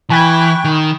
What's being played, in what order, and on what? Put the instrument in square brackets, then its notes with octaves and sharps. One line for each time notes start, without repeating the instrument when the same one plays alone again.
[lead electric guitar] E3 [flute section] G5 C#6 F#6 [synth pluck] G#5 B5 G#6
[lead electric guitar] D#3